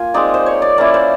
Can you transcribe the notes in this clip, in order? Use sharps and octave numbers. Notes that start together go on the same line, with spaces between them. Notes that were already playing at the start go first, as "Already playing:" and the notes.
Already playing: A#3 F4 G#5
G#3 C4 D#4 D5
C5
C#5
D5
A#3 C#4 E4 D5
C5